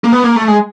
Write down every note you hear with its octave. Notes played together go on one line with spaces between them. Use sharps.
A#3
B3
A#3
A3
G#3